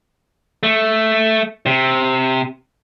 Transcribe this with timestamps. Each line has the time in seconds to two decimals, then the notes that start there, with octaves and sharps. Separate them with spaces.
0.63 A3
1.66 C3